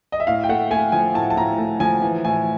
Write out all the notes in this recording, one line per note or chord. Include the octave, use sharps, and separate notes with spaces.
D#5
E5
A2 F5
G5
A3 F#5
A3 G#5
F3 G#5
A2 A5
A5
A2 A#5
A3
F3 G#5
E3
A2 G#5